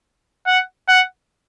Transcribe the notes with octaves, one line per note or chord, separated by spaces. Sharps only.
F#5
F#5